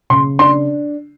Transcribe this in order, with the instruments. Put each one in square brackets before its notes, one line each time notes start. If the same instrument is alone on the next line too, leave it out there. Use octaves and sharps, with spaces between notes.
[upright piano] C#3 C6
D4 C6